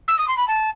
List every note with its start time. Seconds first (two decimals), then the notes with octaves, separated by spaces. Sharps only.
0.08 E6
0.19 D#6
0.28 C6
0.37 B5
0.48 A5